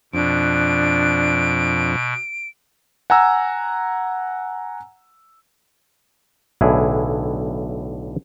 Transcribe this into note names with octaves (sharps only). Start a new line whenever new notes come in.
F2 B2 D4 D7
F#5 G#5 A#5 E6
B1 A2 D3 E4 G#4